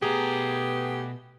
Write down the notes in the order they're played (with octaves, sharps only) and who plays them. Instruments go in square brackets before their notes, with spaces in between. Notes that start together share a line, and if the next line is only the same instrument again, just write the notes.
[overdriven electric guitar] B2 A#5 [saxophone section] A3 B3 [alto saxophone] G4 [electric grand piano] G#4